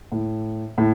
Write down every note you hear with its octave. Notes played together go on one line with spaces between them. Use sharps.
A2
A2